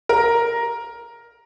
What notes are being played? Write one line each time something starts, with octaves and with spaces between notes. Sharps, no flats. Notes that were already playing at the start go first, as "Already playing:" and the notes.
A#4